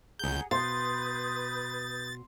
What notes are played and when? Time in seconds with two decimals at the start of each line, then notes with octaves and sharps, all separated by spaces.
0.19 C#2 G#4 F#5 A#5 G6
0.51 B2 B4 C6 D#6 G6 A6